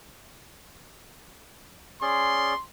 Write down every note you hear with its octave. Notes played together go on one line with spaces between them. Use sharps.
C#4 G#4 D5 C6